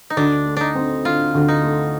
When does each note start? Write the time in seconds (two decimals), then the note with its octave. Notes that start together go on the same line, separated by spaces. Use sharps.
0.10 D#4
0.17 D2 D4
0.45 A3
0.57 D4 D#4
0.75 C4
1.05 D3 F4
1.34 D2
1.48 D#4
1.63 A3